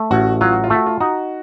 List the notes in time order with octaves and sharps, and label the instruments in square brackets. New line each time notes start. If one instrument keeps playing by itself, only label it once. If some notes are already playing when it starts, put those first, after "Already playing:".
Already playing: [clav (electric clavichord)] A3
[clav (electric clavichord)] A1 [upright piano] F#4
[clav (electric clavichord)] F#3 [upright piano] F4
[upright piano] F#4
F4
[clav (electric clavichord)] A3 [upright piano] F#4
[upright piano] F4
[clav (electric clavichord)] D#4 [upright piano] F#4